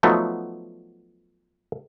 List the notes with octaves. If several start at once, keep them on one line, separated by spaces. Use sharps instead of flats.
F3 F#3 A3 B3 D#4